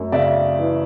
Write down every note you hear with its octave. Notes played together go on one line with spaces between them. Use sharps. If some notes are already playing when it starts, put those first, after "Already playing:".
Already playing: F#2 A3
C#3 D5 E5
E3